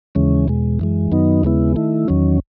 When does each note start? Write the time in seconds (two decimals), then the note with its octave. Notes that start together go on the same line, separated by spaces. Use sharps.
0.15 D#2 C#3 E3 G#3 C#4
0.48 E2 B2 G#3
0.79 F#2 E3 G#3
1.12 F#2 D#3 F#3 B3 D#4
1.43 D#2 C#3 G#3 B3 E4
1.76 D#3 A3 E4
2.08 E2 D#3 F#3 C#4